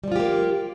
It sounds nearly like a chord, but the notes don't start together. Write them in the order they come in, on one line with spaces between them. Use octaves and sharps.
G3 F3 F4 G4 A#3